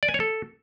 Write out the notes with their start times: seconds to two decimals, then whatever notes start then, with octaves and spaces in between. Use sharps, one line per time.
0.03 D5
0.08 G#5
0.14 C#5
0.20 A4